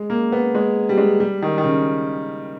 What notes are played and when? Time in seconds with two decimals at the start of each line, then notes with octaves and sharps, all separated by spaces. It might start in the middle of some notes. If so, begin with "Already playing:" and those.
Already playing: G#3
0.10 A#3
0.32 B3
0.55 G#3
0.89 G3
0.98 G#3
1.20 G3
1.42 D#3
1.58 D#3
1.64 C#3